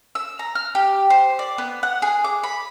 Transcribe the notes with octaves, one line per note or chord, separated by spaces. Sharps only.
E6
A#5
F6
G4
C5
D5
B3
F#5
G#4
D6
B5